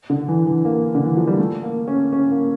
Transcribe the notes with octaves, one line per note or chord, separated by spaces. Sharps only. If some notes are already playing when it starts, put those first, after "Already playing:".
D3
E3
E3
A#3
D3
E3
F3
G3
A3
A#3
C#4
C#4
A#3